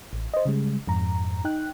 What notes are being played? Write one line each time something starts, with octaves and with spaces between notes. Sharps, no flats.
A1
C5 D#5
C#3 G3 G#3
F2 G#2 A#5
D#4 G5 F#6